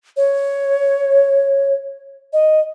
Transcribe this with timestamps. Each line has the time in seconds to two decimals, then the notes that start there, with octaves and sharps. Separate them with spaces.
0.17 C#5
2.33 D#5